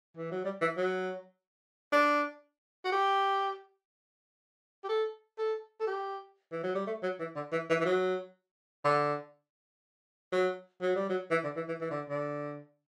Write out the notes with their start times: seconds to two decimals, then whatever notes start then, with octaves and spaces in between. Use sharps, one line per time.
0.17 E3
0.31 F#3
0.45 G3
0.61 E3
0.77 F#3
1.92 D4
2.85 F#4
2.92 G4
4.84 G4
4.89 A4
5.38 A4
5.80 A4
5.87 G4
6.52 E3
6.63 F#3
6.75 G3
6.87 A3
7.03 F#3
7.20 E3
7.36 D3
7.52 E3
7.69 E3
7.80 E3
7.85 F#3
8.84 D3
10.32 F#3
10.82 F#3
10.96 G3
11.10 F#3
11.31 E3
11.44 D3
11.56 E3
11.68 E3
11.81 E3
11.91 D3
12.10 D3